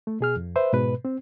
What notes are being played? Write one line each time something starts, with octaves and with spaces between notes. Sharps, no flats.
A3
B2 G#4 F6
F2
B4 C5 E5
G#2 B2 B4
C4